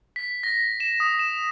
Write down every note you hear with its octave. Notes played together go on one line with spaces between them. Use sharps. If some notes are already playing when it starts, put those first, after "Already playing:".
B6
A#6
E7
D#6
E7